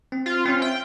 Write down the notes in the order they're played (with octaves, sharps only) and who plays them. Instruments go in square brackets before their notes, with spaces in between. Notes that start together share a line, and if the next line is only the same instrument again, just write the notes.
[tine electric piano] C4
[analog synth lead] F4
[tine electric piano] C4 C#4 [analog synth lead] F4
[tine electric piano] E5 [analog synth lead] G5